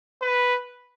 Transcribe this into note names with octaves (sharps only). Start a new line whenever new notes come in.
B4